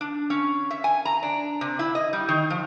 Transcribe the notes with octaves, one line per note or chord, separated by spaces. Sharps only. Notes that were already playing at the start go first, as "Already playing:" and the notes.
D4
C#4
E5
G#5
A#5
D4
C3
E4
D#5
G3
D#3
F3